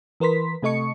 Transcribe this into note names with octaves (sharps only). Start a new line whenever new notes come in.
E3 A#4 B4 C6 B6
C3 A3 A4 D#5 C#6 C#7